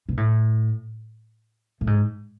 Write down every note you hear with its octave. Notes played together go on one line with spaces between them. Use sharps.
B2
A2
A2
G#2